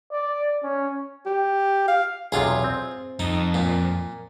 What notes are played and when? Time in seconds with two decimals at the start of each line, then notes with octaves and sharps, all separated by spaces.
0.12 D5
0.63 C#4
1.26 G4
1.88 F5
2.32 B1 E2 C3 F4 G#4
2.64 C4
3.19 F2 D#4
3.54 A#2